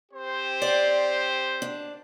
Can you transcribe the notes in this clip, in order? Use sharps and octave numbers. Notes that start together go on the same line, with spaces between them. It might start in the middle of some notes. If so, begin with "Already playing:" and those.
C4 G4 C5
D5
D4